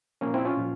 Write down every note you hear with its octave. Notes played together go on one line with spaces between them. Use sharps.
A#2 F3 A#3 C#4
C4 E4
C#4 F4
A#2 F3